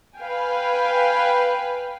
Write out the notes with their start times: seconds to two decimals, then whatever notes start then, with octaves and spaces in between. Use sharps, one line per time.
0.17 B4 F5 G5 G#5